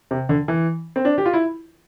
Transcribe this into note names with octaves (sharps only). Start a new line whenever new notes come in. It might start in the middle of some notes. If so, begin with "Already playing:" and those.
C3
D3
E3
C4
D4
G4
F4
E4